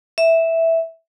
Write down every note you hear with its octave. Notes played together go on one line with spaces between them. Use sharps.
E5